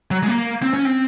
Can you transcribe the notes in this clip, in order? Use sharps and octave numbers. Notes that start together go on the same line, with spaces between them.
F#3
G#3
A#3
C4
C#4
C4